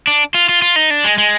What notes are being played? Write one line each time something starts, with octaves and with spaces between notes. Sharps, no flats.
D4
F4
F4
F4
D#4
D4
G#3
G#3